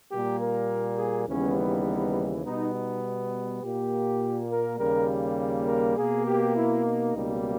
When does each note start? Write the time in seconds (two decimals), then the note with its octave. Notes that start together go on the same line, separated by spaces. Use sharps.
0.11 A#2 G3 A#3 G4
0.40 A#4
0.98 G#4
1.27 D#2 C#3 E3 G3 B3 C#4
1.57 D#4
2.45 B2 G3 B3 D#4
2.74 D#4
3.63 A#2 A#3 G4
4.50 A#4
4.79 D#2 C#3 G3 A#3 A#4
5.67 A#4
5.97 B2 A#3 G#4
6.26 G4
6.55 E4
6.84 D#4
7.14 C#2 B2 G3 A#3